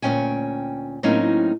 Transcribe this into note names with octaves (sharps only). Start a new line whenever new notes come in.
D2 A#2 C#3 C#4 G5 G#5
A2 F#3 A#3 C4 C#4 D#4